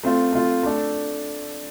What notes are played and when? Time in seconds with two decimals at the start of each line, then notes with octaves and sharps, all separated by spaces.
0.03 A3 C4 F4
0.33 A3 C4 F4
0.63 A3 D4 A4